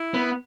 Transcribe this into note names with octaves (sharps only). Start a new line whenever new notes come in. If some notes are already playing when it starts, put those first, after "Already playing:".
Already playing: E4
B3